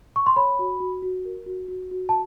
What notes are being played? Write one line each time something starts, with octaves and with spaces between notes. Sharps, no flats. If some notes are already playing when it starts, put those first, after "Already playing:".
C#6
C6
C#5 B5
F#4
F#4
F#4
A#4
F#4
F#4
F#4
A5